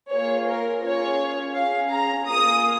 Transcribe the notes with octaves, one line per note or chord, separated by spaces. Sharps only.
A#3 F4 G#4 C#5
A#4
C#4 F4 G#4 C#5
C#4 G#4 F5
A#5
A#3 F4 G#4 D#6